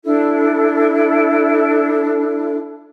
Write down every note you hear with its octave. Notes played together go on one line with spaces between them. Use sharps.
D4 E4 A4